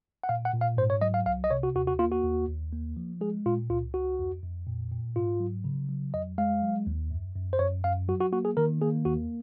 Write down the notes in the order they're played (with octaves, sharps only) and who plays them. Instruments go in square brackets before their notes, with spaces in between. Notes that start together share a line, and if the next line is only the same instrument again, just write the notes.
[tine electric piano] F#5
A#2 F5
F#5
A#2
F5
G#2 C5
C#5
F#3 D#5
F5
C2 F5
D#5
C3 C#5
F#4
D#2 F#4
F#4
A#3 F4
F#4
D#2
D#2
A#3
F3
G#3 G#4
A#2 F4
C#2 F4
C#2 F#4
F2
F2
A#2
A#2
G#2 F4
F#3
C#3
F#3
F2 D#5
G#3 F5
F#3
D#2
F#2
F#2
C5
F#2 C#5
F#2 F5
F#3 F#4
F#4
A#3 F#4
G#4
D#3 A#4
A#3 G#4
D#2 F#4